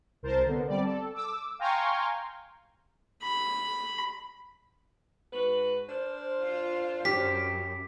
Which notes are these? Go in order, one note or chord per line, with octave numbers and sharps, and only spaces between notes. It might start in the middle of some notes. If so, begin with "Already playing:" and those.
C2 A#4 C5 A5
D3 B3
G3 C4 D5
A4
D6 E6
F5 G5 G#5 A#5 C6 C#6
B5
G#2 F#4 B4
D4 A#4 C5
F4
F#2 G4 B6